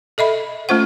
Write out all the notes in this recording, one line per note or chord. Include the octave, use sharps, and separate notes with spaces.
A4 D#5 E5 B5
A3 C#4 F4 C5 F#5